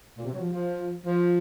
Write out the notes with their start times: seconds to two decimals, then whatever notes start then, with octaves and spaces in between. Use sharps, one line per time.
0.17 A#2
0.25 C3
0.32 F#3
0.39 F3
0.52 F3
1.05 F3